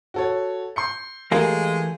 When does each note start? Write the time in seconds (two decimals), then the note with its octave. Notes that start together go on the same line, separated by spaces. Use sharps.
0.14 F#4 A4 C#5
0.76 C6 G6 C#7
1.31 E3 G#3 A3 G4 A#4 F5